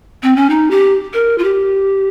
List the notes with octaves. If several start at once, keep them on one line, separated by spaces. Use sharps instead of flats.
C4
C#4
D#4
G4
A#4
F4
G4